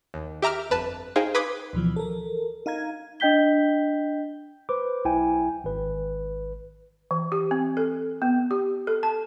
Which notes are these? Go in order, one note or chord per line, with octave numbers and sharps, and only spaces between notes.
D#2
G4 E5 A#5 D6 F6
G1 F2 B4 A5
D#4 G#4 C5 F5 G5
B4 B5 C6 D6 D#6 G#6
D2 B2 E3 F3
A4 A#4
D#4 F5 A#5 G#6
D4 D#5 G5 G6 B6 G7
B4 C5 D6
B1 E4 G5 G#5
G#1 B4
E3
G4
C4
A4
B3
G4
A4
A5